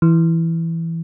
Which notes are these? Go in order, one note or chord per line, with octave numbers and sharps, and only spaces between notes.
E3